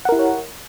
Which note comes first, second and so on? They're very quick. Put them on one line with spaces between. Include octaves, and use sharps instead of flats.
F#5 A#4 E4 G4 C#5